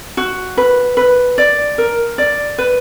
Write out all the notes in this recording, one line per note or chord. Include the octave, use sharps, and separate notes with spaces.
F#4
B4
B4
D5
A#4
D5
B4